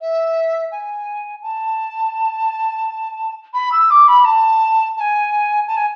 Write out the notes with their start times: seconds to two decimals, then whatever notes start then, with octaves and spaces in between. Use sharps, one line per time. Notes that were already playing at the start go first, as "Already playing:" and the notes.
0.01 E5
0.72 G#5
1.42 A5
3.54 B5
3.72 E6
3.91 D6
4.08 B5
4.25 A5
4.97 A5
5.00 G#5
5.67 A5
5.77 G#5